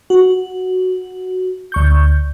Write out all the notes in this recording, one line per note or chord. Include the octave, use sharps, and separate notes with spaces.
F#4
D2 C#6 G6